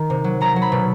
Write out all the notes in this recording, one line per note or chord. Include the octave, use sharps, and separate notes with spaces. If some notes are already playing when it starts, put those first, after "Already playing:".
Already playing: D#3
C3
F#3
F#3 A#5
F#3
B5
B2